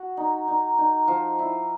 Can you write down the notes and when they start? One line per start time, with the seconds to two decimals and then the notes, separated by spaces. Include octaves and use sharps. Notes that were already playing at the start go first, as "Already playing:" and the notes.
Already playing: F#4
0.17 D#4
0.48 D#4
0.78 D#4
1.08 F3
1.39 E4